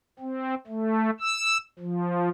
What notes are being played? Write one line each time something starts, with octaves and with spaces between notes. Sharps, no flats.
C4
A3
E6
F3